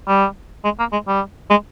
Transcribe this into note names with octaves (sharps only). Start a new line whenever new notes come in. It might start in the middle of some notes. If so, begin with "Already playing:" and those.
G3
G#3
A#3
G#3
G3
G#3